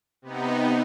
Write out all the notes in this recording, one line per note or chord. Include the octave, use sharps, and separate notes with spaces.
C3 B3 D#4